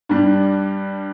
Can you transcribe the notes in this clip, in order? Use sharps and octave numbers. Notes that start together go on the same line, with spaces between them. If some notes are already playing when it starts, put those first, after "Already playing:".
G2 G3 D4